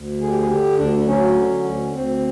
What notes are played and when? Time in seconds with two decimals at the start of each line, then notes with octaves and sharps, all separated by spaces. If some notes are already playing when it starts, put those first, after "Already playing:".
Already playing: D2
0.21 D3 G#4
0.30 G4
0.39 G#4
0.49 D3 G4
0.78 D2 D4
0.99 D4
1.06 F#3 C#4
1.35 D3
1.65 D2
1.93 D2 C4